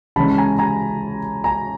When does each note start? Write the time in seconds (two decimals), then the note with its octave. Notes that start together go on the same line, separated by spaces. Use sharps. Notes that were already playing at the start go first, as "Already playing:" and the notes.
0.16 C#3 E3 G#3 C#4 A5 B5
0.28 B5
0.38 G#5 A#5
0.59 G#5 A#5
1.44 G#5 A#5